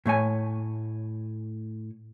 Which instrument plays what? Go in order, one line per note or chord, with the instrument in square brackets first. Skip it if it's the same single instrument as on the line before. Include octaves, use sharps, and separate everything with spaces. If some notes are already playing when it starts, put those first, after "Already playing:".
[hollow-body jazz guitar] A2 A3 C#5 G#5